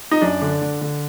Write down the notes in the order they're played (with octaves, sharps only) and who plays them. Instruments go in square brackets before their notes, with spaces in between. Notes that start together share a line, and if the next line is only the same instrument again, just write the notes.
[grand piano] D#4
F#2 D4
D3
D3
D3